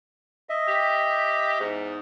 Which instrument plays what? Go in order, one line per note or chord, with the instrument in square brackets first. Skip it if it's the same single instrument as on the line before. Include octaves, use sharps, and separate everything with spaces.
[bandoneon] D#5 E5
[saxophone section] G4
E2 G#2